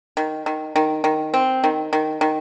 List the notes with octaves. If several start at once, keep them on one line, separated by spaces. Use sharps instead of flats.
D#3
D#3
D#3
D#3
C4
D#3
D#3
D#3